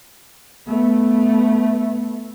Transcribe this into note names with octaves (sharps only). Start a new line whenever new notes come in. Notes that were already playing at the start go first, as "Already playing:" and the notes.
A3 B3